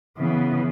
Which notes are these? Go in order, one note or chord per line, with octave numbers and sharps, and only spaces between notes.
C#3 E3 B3